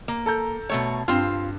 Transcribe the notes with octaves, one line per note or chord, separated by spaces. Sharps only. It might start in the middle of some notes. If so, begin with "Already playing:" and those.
A#3
A4 A#5 G6
B2 A3 C#5
G2 C4 F4